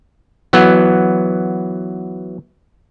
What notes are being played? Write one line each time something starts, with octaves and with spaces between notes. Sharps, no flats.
E3 F#3 B3